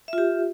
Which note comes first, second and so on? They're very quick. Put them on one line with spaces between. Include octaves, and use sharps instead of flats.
E5 F4 G4